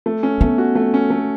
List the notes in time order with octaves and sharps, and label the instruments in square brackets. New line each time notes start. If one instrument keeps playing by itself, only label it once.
[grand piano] A3
C#4
[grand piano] A3 [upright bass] B3
[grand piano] F#4
A3
C#4
A3